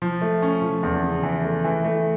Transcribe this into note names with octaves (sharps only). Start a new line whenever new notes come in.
F3
A3
C#4
F3
E2
C#3
E3
A3
E3
A3